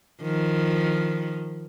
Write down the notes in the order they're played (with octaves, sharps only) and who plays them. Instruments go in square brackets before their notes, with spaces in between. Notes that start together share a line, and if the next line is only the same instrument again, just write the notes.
[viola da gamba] D#3 F3